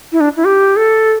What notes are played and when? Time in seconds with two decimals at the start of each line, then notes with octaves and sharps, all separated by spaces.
0.12 E4
0.20 D4
0.37 E4
0.45 G4
0.76 A4